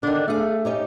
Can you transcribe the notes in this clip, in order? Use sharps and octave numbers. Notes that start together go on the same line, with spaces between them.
D3 D#3 D4
A3 G#4 F5
C#4 D#4 G4